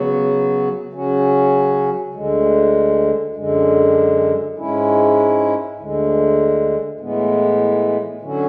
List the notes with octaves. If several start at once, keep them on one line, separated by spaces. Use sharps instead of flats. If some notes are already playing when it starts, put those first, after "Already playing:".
Already playing: C#3 F#3 B3 F#4
C#3 F#3 C#4 F#4
D2 D3 G#3
F#2 D3 G#3
G#2 G#3 C#4 E4
D2 D3 G#3
A2 E3 G#3 B3
D3 F#3 C#4 F#4